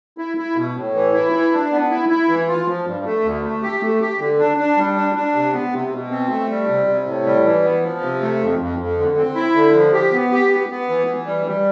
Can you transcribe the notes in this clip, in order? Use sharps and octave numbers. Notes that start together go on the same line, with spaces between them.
E4
E4
B2
A2
E3
E4
E3
D4
B3
E4
E4
E3
F4
F3
G2
A3
D2
A3
G4
A3
G4
D3
D4
D4
G3
D4
D4
C3
B3
C3
B2
C4
A3
G3
C3
C3
A2
G3
E3
B3
F3
C3
A3
F2
F2
F2
D3
C4
E4
D3
F3
G4
B3
G4
B3
B3
E3
E3
G3
G3